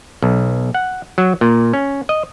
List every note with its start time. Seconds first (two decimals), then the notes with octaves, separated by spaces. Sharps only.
0.22 B1
0.74 F#5
1.18 F#3
1.41 A#2
1.73 C#4
2.09 D#5